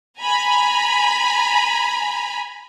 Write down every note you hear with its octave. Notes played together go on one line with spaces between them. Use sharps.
G#5 A#5 B5